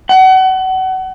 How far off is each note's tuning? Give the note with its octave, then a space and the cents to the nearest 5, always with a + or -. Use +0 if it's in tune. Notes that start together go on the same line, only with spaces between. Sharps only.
F#5 +30